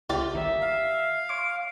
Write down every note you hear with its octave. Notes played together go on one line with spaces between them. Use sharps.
C2 C#3 A3 F4 G4 D5
G1 D#3 A#3 E5
F5
C#5 C6 D6 D7